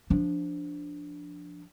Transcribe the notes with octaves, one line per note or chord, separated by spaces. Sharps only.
F3 D4